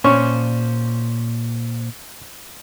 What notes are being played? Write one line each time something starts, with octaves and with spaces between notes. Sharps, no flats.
A#2 C#4 C5 D5 C#6